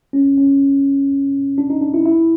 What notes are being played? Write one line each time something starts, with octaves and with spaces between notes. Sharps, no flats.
C#4
C#4
D4
D#4
D4
E4
E4